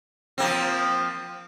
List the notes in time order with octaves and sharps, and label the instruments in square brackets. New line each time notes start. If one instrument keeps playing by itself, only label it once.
[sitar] F3 A#3 C4